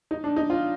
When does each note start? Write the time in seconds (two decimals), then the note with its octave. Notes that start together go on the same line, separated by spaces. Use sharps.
0.11 D#4
0.24 D4
0.36 D#4
0.50 F4